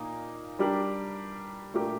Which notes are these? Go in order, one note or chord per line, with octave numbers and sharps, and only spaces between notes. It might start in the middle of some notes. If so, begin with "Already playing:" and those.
Already playing: A#2 A#3 D#4
G3 D4 G4 A#4
A#2 A3 D4 G4 A#4